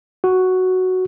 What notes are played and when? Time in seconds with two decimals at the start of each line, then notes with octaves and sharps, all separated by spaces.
0.24 F#4